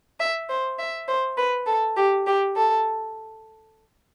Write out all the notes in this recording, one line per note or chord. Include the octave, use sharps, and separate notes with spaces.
E5
C5
E5
C5
B4
A4
G4
G4
A4